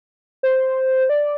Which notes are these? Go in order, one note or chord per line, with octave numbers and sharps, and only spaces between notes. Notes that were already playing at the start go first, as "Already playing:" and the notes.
C5
D5